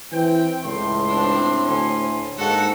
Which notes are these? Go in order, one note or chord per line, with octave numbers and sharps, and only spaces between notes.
E3 C4 G5
C#2 A2 C6
C4 D4
D2 C#4
G#2 A#3 F#4 A4 F#5